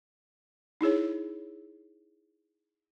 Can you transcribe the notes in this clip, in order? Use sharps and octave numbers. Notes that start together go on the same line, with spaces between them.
D#4 E4 G#4 C#5